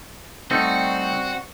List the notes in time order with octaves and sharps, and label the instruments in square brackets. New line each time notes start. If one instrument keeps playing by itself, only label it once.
[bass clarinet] G3 [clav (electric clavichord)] A3 D#4 [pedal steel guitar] C4 [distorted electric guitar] F#4